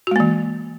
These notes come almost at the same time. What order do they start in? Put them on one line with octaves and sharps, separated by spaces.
F#4 G#3 A#3 E3